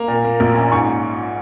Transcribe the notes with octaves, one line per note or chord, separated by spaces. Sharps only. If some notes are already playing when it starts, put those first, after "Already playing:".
Already playing: A#3 A#5
A#2
A#3
A#1
C#4
G#2 C#6